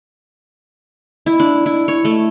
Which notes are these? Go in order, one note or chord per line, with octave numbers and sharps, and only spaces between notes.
E4
D4
E4
C#5
A3